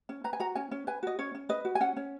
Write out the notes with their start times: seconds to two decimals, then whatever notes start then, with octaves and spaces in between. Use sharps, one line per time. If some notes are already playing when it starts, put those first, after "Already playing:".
0.09 C#4
0.24 B4 A#5
0.33 G#5
0.40 F#4 A#5
0.55 C#4 G#5
0.71 C#4
0.87 B4 G#5
1.03 F#4 D#5
1.19 C#4 C#5
1.35 C#4
1.49 B4 D#5
1.65 F#4
1.75 G#5
1.80 C#4 F#5
1.96 C#4